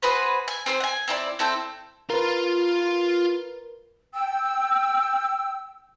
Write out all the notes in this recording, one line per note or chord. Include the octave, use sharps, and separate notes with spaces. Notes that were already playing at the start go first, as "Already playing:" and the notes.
F#4 G#4 B4 C5
G#5
C4 G#4 A4 C5
F#5 G#5
C4 E4 A#4 D5
C4 E4 A4 G6
F4 A#4 B4 F5
G5 E6